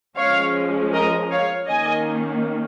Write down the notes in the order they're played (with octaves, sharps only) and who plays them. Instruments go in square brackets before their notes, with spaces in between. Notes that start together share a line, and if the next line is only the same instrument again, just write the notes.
[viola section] F3 G#3 C#4 C#5 F5
A#4 D#5
C#5 F5
D#3 A#3 C#4 D#5 G#5